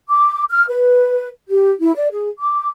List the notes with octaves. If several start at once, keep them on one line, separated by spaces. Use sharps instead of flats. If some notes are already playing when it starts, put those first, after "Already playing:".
D6
F6
B4
G4
E4
D5
G#4
D6